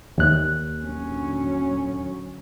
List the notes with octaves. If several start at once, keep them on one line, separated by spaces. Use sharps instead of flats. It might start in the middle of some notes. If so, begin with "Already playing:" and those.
D#2 F#6
D3 F#3 C#4